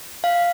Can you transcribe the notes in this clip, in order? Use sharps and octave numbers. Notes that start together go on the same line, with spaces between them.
F5